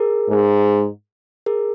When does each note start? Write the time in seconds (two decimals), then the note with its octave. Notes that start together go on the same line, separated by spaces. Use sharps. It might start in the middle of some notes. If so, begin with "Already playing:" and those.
Already playing: G#4 A#4
0.29 G#2
1.46 G#4 A#4